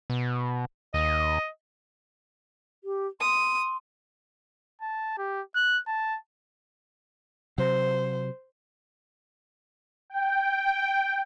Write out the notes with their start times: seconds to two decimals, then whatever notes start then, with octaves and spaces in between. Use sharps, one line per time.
0.10 B2
0.94 D#2 D#5
2.84 G4
3.21 C6 D#6
4.82 A5
5.18 G4
5.55 F#6
5.87 A5
7.58 C3 F#3 C5
10.10 G5